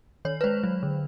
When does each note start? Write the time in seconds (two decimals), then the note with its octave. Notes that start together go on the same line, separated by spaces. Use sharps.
0.25 D#3 C#5
0.41 B4
0.44 G#3 C5
0.64 F#3
0.83 D3